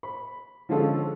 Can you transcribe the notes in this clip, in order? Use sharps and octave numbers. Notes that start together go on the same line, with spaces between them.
B5
D3 F3 G#3 C#4 F4 A4